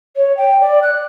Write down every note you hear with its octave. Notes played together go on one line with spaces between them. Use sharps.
C#5
G5
D5
F#6